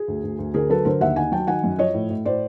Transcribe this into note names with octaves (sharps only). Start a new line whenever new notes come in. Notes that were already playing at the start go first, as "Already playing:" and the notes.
Already playing: G#4
D2
D2
D2
D3 G#4 A#4
F#3 A4 B4
D3 A#4 C5
D#2 E5 F#5
D#3 F#5 G#5
F#3 G5 A5
D#3 F#5 G#5
F#2
F3 C#5 D#5
A2
A2
A2 C5 D5